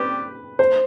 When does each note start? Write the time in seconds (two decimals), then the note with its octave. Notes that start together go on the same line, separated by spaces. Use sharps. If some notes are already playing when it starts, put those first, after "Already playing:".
Already playing: G3 C4 G4 B4
0.59 C5